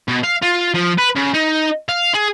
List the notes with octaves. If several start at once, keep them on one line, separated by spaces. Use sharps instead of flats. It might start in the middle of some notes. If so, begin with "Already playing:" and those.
B2
F5
F4
F3
B4
C#3
D#4
F5
G#4